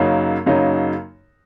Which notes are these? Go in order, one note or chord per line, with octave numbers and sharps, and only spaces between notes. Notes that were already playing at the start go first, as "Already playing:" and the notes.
Already playing: F#2 C#3 F#3 A#3 D#4
F#2 C#3 F#3 A#3 D#4